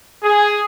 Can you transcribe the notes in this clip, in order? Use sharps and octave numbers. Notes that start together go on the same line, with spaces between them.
G#4